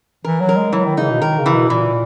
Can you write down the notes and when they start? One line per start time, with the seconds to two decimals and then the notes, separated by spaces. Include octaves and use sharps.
0.24 E3 A#4
0.40 F#3
0.49 A#4
0.57 G#3
0.73 E3 F#3
0.86 D#3
0.97 C#3 D#4
1.10 B2
1.22 D#3 A#4
1.38 C#3
1.46 E3
1.54 B2
1.70 A#2 E3